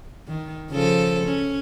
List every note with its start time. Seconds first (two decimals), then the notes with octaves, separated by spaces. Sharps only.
0.27 D#3
0.70 C#3 F3 A4
1.24 C#4